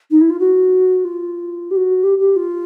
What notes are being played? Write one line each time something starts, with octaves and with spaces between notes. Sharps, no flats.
D#4
E4
F4
F#4
F4
G4
F#4
G4
G4
F4